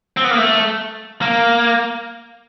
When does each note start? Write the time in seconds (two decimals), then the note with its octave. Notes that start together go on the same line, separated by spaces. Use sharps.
0.17 C4
0.24 B3
0.31 A#3
0.38 A3
1.22 A#3